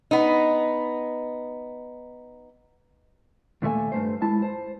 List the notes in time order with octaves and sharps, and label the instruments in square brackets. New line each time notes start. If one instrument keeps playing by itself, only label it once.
[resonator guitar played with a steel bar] B3 D#4
[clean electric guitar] D#2 A#2 A3 E5 G#5
G2 A3 C5
G#3 E4 A5
C5